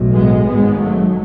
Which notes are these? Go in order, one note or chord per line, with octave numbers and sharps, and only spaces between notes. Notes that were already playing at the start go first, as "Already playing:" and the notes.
Already playing: B1 A2
G#3 B3
G#1 G#2 G#3 B3
F#3 A3